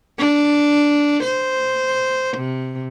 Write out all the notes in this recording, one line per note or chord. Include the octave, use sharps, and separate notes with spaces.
D4
C5
C3